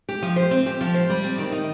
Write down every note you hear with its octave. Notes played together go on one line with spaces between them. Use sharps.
G4
F3
C5
C4
G4
F3
C5
G3
C4
D#3
D#4